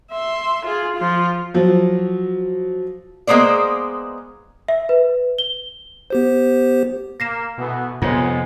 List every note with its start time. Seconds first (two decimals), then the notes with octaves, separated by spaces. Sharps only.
0.11 E5 C6
0.65 F4 G#4
0.97 F3 F4
1.54 F3 F#3
3.27 G#3 A#3 B3 C5 D5
4.68 E5
4.89 B4
5.38 G7
6.10 B3 G4 C5
7.20 A#3 A#6 C7 E7
7.58 B2 E3 A3 B3
8.02 F2 C3 G#3 B3 F4 C#5